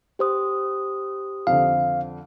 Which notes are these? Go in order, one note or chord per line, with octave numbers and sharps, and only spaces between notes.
G4 C5 D#6
F2 D3 F5